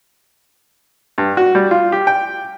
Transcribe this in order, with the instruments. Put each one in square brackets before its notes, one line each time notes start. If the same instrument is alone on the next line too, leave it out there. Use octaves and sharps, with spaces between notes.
[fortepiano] G2
F#4
G3
F4
G4
G5